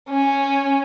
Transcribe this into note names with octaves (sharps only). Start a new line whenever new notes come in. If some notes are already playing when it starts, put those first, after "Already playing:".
C#4